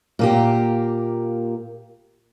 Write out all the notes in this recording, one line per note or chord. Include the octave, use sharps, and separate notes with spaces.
A#2 A#3 G4